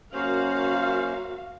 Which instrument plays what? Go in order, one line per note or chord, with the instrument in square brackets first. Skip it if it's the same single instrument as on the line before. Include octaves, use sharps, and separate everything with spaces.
[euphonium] F#2 [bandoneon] A#3 C#4 C5 [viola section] F#4 F5